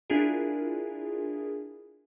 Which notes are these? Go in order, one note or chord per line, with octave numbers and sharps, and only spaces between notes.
D4 E4 F4 G#4 A#4